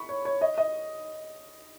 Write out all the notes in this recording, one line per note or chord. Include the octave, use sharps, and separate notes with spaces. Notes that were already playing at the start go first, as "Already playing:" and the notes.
Already playing: B5 C#6
C#5
C#5
D#5
D#5